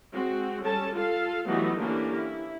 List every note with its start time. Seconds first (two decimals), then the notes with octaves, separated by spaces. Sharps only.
0.14 G#3 C4 F#4
0.64 G3 C#4 A4 A5
0.95 F4 A4 F5
1.47 E3 F#3 G3 A3 B3 D#4
1.79 D3 E3 A#3 C#4 D4 G4
2.15 E4